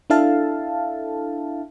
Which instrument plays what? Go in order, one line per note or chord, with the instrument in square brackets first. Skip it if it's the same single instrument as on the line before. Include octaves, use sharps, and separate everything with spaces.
[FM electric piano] D4 E4 A4 E5 F5 A5